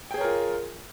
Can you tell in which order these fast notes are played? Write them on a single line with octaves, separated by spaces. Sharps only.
G5 G#4 C#5 A#4 F4